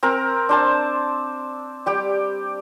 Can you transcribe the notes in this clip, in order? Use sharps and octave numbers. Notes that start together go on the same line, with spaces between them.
C4 A#4 A#5
D4 C5 A5
G3 G4 G5